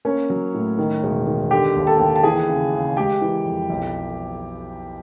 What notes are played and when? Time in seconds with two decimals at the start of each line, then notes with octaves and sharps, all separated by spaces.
0.05 A#3 C#4 C#5
0.30 F#3
0.54 A2
0.78 D#3
1.03 E1
1.26 D#3
1.51 D3 G4 G5
1.76 D#2
1.87 A4 A5
1.99 D#2
2.16 A5
2.23 E3 G#4 G#5
2.49 C#3
2.73 C#3
2.97 G#3 G4 G5
3.22 E3
3.45 F2
3.70 B1